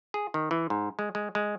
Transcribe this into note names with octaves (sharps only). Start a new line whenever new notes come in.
G#4
D#3
E3
G#2
G#3
G#3
G#3